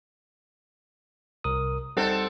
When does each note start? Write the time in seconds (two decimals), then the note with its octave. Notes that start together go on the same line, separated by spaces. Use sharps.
1.44 C2 A#4 D#6
1.97 G3 C4 D#4 A4 F#5